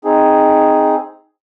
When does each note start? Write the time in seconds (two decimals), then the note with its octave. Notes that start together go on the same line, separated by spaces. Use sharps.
0.05 C4 D#4 G#4